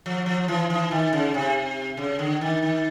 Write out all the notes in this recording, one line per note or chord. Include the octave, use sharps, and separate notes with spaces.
F3
F3
E3
E3
D#3
C#3
C3
C#3
D3
D#3
D#3